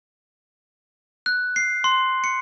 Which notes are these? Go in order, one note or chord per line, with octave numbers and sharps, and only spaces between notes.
F#6
C7
C6
C#7